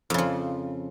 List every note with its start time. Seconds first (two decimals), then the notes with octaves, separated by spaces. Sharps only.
0.10 F2
0.14 C#3
0.18 F3